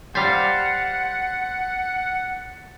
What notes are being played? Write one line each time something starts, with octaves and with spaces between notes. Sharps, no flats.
G3 C5 F5 F#5 G#5 A6 B6 C7